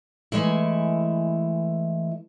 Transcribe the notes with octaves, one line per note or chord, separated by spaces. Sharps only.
E3 G#3 A3 E4